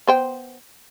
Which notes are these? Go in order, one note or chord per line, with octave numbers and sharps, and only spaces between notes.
B3 C5 G5